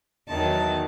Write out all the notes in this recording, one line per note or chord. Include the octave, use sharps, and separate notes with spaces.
E2 D#3 F#3 A5